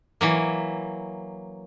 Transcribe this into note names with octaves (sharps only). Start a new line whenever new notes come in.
E3 F#3 A#3